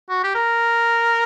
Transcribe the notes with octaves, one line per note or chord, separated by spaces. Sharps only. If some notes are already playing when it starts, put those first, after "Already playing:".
F#4
G4
A#4